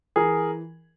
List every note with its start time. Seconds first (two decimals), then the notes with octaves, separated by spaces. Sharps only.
0.16 E3 G#4 A#4